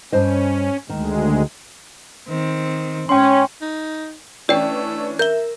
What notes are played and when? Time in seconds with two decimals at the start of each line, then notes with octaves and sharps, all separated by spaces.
0.12 G2 C#4 C5 D#5
0.89 D2 D#3 G#3
2.29 D#3 C4
3.09 G#2 C#4 G5 C6
3.61 D#4
4.49 E3 A3 C#4 D4 D5 G5
5.19 A#4 E5 G6 G7